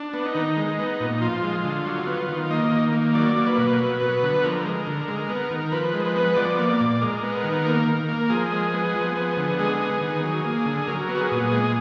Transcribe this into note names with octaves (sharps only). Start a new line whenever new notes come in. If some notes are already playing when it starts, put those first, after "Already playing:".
Already playing: D4
B3
D#4
D#3
G#3
B3
A#2
F3 F4
G#3
D3
F#3
B3
D#3
A#3 D#5
D#3
A#3
F#3 D5
A#3
B4
B2
F#3
B3
D3
F3 A#4
G#3
D3
G#3
B3
D#3
F3 B4
G#3
B4
B3
F3 D5
A#3
D5
A#2
G#3 A#4
B3
D#3
A#3
D#3
A#3
F3 G#4
G#3
B3
F3
B3
D3
G#3 G#4
B3
D#3
F#3
A#3
D3
F#3 A#4
B3
F#4
G#4
A#2
G#3